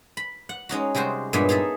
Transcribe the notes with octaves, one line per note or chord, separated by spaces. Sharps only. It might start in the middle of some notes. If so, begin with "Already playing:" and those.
B5
F#5
G#3 C#4 D#4 F#4
C3 G3 G#3 F#4 C5
G2 A#2 G#3 B3 C#5 E5
D#4 G#4 A4 E5